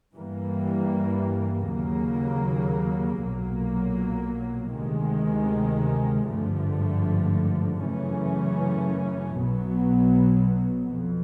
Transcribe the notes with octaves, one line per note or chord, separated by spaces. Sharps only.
G2 E3 G3 A#3
D#2 C#3 F#3 A#3
B1 A#2 F#3 A#3
D2 C3 D#3 G#3
G#1 G2 D3 F3 A3
F#2 C#3 E3 A3 C#4
B1 B2 F#3 B3
F2